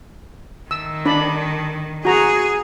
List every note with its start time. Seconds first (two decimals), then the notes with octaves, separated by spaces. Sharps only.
0.71 D#3 E6
1.06 D4 D5 B5
2.05 F#4 G#4 A#5